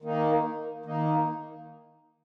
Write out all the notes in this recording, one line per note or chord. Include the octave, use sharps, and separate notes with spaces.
D#3 A#3 D#4
D#3 A#3 D#4